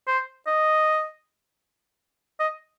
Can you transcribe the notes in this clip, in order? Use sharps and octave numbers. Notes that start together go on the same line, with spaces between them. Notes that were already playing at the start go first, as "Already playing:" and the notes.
C5
D#5
D#5